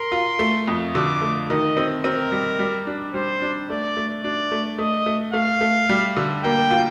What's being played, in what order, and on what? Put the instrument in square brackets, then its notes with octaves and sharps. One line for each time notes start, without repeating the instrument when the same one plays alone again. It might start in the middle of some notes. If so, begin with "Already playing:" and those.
Already playing: [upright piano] A#4 [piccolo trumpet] C6
[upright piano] F4
A3
F2
[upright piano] D3 [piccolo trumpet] D6
[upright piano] A3
[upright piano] D#3 [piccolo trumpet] D#5
[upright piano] C4
[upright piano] C4 [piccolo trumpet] A#4
[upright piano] G3
G3
D4
[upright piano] G3 [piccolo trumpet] C5
[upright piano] D4
[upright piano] A3 [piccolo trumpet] D5
[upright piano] A3
[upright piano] D4 [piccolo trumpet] D5
[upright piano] A3
[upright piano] A3 [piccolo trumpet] D#5
[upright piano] A3
[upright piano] A3 [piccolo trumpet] F5
[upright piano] A3
G3
D3
[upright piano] A#3 [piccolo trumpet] G5
[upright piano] F4